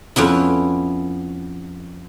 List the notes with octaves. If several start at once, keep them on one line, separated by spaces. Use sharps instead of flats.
F2 B3 C#4 E4